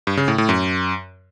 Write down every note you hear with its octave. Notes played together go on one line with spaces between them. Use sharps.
G2
C#3
A2
A2
F#2